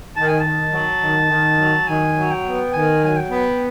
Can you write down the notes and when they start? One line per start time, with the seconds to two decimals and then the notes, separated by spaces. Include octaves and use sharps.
0.16 D#3 A5
0.28 G#5
0.40 A5
0.45 D#3
0.73 F#3
1.02 D#3
1.31 D#3
1.59 F#3
1.87 D#3 G#5
2.17 F#3
2.31 G5
2.45 B3
2.73 D#3 G#5
3.02 F#3 G#5
3.16 G5
3.30 B3